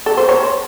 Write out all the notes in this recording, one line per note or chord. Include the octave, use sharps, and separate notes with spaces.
A4
C5
C#5